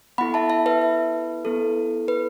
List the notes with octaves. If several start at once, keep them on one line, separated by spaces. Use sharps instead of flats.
B3 E4 A4 F#5 B5
E5 A5
E5 A5
B4 E5
B4
B3 E4 A4
B4